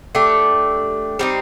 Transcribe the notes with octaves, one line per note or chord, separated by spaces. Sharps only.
A3 D4 G4
G3 C4 D#4